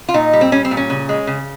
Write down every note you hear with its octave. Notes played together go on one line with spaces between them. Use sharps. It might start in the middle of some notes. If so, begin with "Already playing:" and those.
F4
A#2 D#4
G3
C4
G3 C#4
C4
A#2
C#4
C#3
G#3
C#3